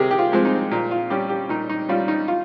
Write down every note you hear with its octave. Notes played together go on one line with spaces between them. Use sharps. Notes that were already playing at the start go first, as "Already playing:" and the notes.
Already playing: C3 C4 G4 G#4 A#4
G4
F4
F3 G#3 C4
D#4
A#2
F4
G3 C#4 G4
G4
A#2 D#4
D#4
G3 C#4 F4
D#4
F4